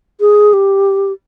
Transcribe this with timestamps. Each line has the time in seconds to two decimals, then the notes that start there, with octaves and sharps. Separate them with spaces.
0.21 G#4
0.53 G4